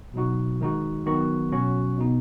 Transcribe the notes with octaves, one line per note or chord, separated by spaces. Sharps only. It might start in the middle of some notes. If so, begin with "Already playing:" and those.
B2 F#3 D#4 F#4
D#3 G#3 D#4 F#4
D#3 F#3 B3 D#4 F#4
B2 F#3 C#4 F#4
B2 B3 D#4